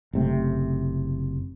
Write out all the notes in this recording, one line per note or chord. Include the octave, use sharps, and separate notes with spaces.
F#1 C3 A3